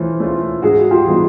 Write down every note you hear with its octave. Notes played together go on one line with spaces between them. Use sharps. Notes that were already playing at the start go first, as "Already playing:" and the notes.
Already playing: E3 A3 C#4 F4 C5
A3 C#4 F4
G#2 F#4 G#4
F4 G4
E3 G3 B3 D#4